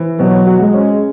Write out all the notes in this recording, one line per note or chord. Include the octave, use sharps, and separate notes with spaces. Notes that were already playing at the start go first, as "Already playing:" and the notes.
Already playing: E3
B2 F#3
F#4
G#3
C#4